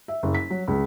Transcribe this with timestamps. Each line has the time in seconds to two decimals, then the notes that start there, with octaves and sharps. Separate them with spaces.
0.08 E5
0.23 F#1
0.35 B6
0.50 F#3
0.67 C#2